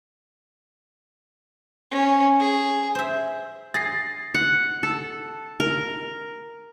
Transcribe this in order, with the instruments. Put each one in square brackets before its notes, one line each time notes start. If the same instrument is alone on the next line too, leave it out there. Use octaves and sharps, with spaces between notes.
[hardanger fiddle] C#4
G#4
[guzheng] C5 E5
[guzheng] G#4 [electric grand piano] A6 A#6 C7
[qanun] F#5
A4
A#4